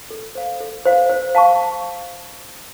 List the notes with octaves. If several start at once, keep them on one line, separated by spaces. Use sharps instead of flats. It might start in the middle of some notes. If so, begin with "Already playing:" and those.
A4
C5 F5
A4
C5 F5
C5
F5 A5 C#6